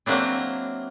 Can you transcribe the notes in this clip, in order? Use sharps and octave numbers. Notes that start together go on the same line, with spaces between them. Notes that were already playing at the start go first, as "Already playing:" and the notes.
F#3 A#3 C4 D4 E4